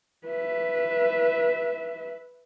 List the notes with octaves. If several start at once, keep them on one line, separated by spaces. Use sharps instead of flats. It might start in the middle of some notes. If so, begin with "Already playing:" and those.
B4 E5